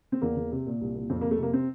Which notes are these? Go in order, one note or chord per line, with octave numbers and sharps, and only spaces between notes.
C4
E2 A#3
E2
C3
A#2
C2
A#2
F2 C4
A#3
F2
A3
C3 A#3
C4